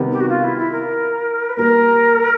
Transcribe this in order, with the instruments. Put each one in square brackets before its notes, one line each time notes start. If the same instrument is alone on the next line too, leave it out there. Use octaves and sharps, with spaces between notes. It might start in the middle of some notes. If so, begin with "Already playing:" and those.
Already playing: [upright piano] C3 D#3 G3 B3
[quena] G4
F#4
F4
E4
E4
A#4
B4
[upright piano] A#2 G3 A#3 [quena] A#4